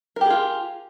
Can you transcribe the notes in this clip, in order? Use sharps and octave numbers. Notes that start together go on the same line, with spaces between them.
F4 G4 G#4 A#4